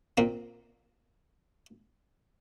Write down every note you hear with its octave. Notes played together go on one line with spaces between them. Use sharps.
A#2 A#3 C4